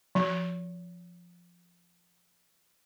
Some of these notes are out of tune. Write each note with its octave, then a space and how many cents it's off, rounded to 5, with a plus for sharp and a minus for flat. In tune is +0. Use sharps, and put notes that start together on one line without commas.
F3 +0